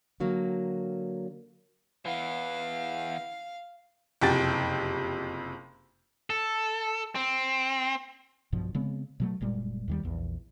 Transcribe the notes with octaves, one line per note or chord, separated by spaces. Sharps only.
D3 F#3 A#3
E3 B3 F5
F#1 F2 C3 G5 A6
A4
C4
B1 G2 B2 F3
C#3 G#3 B3 C4
B2 F#3 A3
F#1 A#2 G3 G#3
D#2 D#3 G3
A#1 E2